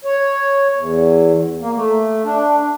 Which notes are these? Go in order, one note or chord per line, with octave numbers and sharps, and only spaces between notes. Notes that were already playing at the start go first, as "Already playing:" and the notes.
C#5
E2
A#3
A3
D4